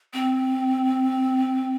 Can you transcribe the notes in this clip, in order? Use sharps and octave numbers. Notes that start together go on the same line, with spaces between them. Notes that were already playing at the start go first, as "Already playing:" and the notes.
C4